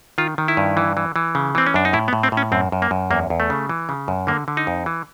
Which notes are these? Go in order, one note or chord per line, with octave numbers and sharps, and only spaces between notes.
D#3 F4
D#3
E4
G2
E3
E3
E3
C#3
E3 C4
C#4
F#2 D4
D#4
A2 E4
B3
A2
C4
A2
C#4
F#2 C4
F#2
A#3
F#2
E2 A#3
E2
A3
C#3
E3
C#3
F#2
D3 A#3
D3
D#4
F2
E3